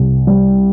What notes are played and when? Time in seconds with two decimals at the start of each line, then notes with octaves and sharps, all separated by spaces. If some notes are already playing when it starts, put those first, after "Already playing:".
Already playing: C2
0.27 G3